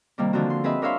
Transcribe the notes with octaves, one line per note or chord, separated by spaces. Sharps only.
C3 D#3 G3 A#3
D3 F3 C4 F#4
C6
C4 G#4 B4 D#5 E5
D4 A#4 C#5 E5 F5 C6